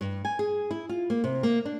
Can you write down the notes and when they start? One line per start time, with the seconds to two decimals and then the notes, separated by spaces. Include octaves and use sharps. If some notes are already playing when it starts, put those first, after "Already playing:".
0.01 G2
0.25 G#5
0.39 G#4
0.71 E4
0.89 F4
1.10 A#3
1.24 C3
1.43 A#3
1.65 D4